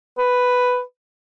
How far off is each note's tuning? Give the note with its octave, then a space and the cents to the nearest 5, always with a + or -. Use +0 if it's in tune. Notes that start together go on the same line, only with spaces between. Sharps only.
B4 +5